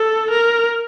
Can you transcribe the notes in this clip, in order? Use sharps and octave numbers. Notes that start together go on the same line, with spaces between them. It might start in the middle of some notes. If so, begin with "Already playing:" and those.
Already playing: A4
A#4